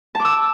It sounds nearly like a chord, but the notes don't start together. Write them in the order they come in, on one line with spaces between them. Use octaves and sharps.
A5 D6 E6